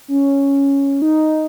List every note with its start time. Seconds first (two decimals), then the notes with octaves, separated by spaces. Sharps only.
0.08 C#4
1.02 D#4